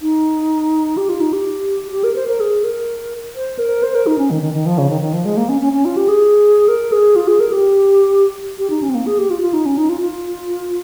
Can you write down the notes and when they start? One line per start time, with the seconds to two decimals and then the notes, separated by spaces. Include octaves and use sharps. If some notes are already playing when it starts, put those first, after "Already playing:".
0.02 D#4
0.97 G4
1.09 F4
1.21 D#4
1.33 G4
1.92 G4
2.04 A#4
2.16 C5
2.28 A#4
2.40 G#4
2.64 A#4
3.36 C5
3.59 A#4
3.83 C5
3.95 A#4
4.07 D#4
4.18 C#4
4.31 D#3
4.42 D#3
4.54 D#3
4.66 F3
4.78 C#3
4.90 D#3
5.01 D#3
5.13 F3
5.25 G#3
5.37 A#3
5.49 C#4
5.61 C#4
5.73 C#4
5.85 F4
5.97 G4
6.08 G#4
6.68 A#4
6.92 G#4
7.16 F4
7.28 G#4
7.40 A#4
7.52 G4
8.59 G4
8.70 D#4
8.82 C#4
8.89 C4
8.95 A#3
9.06 G#4
9.18 G4
9.30 F4
9.42 F4
9.53 D#4
9.66 C#4
9.78 D#4
9.89 F4
10.01 F4